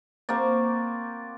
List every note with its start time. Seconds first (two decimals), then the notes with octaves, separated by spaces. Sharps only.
0.29 A#3 C4 F#4 D5